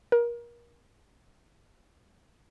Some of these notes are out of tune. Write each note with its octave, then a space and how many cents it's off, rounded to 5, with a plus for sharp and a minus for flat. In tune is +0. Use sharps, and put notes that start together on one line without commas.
A#4 +30